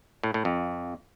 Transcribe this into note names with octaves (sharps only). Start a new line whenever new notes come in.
A2
A2
F2